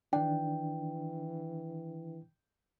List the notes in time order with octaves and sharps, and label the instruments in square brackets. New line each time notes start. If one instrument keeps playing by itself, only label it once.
[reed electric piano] D#3 D4 [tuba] E3 [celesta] G5